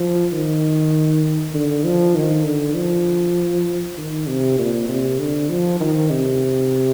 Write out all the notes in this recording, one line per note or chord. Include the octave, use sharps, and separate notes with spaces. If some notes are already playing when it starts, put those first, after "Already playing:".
Already playing: F3
D#3
D3
F3
D#3
D3
F3
D#3
C3
A#2
C3
D3
F3
D#3
C3